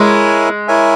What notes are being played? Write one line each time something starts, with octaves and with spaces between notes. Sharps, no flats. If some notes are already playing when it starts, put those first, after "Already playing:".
Already playing: G#3 E4 A#4 C#5 E5 G#5
E4 A#4 C#5 E5 G#5